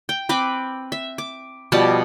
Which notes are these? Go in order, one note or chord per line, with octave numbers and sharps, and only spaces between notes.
G5
C4 B4 D6
E5
D6
B2 F3 G3 A5